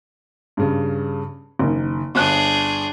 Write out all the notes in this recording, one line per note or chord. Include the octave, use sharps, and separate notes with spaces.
G2 C#3
F#1 D#3
G1 D4 G#4 F#6